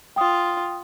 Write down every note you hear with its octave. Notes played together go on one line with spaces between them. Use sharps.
F4 G5 D#6